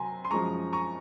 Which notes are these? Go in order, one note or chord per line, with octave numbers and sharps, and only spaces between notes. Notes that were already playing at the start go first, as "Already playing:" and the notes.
Already playing: C3 F#3 G#5 A#5 C6
C6
F#2 F3 G#3 A#5 C#6
A#5 C#6